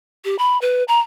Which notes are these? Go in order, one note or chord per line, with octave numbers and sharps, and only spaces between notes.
G4
B5
B4
A#5